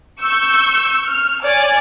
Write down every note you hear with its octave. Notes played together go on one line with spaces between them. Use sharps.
C#6 E6 G6
F6
C#5 D5 G#5